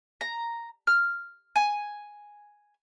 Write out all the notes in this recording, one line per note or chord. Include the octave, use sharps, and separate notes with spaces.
A#5
F6
G#5